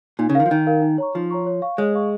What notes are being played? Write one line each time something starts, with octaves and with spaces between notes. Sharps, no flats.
A#2 D#4
C#3
D#3 A#4 F5
F3
D#3 D#4
A#4 F5
D#4
C#5 A#5 C#6
F3 D#4
C#5 A#5 C#6
C#5
F5 C#6
G#3 C#5
F5 C#6